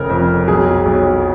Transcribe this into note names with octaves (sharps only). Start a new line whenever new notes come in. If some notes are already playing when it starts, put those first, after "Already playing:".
Already playing: F1 C#3 A#4
F2
B1 G#4
B1